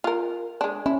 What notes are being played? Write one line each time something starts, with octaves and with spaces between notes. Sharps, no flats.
F4 A#4
G#3 D4
C#4 E4